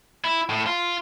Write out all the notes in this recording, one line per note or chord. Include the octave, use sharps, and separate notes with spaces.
E4
A2
F4